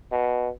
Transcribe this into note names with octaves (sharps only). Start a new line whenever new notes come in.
B2